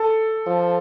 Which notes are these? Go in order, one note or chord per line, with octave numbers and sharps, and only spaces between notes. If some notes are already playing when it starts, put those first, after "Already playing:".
Already playing: A4
F3